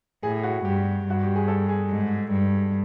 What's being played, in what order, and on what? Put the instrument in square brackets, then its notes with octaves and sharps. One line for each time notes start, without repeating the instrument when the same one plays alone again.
[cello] A2 [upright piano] G#4
[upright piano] F#4
[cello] G2 [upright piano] G4
[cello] G2 [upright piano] F#4
[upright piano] G4
G#4
A4
G#4
[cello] G#2
G2